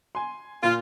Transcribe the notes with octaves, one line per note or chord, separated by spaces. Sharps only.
G#5 C6
A#2 F4